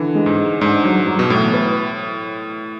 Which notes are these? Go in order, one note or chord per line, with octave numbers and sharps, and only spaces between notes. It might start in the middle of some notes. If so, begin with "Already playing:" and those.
Already playing: D3 E3
G#3
G#2
G#3
G#2 D4
F#3
F#3
B2
A2 E3
B4